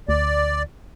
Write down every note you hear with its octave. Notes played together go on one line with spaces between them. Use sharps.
D2 D5